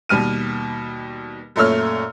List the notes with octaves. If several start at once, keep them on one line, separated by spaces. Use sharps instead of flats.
D#2 B2 G3 F6 D#7
F#2 A#2 A3 C#5 E6 F6